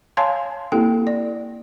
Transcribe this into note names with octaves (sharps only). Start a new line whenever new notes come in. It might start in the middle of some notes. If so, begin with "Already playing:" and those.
C#5 F5 G#5 A5 C6
A#3 C4 E4 G4 A4 G5
D5